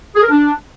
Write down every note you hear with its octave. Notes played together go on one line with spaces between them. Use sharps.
G#4
A#4
D4